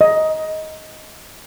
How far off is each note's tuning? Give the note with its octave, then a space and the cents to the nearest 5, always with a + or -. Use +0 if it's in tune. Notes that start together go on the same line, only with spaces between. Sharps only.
D#5 +10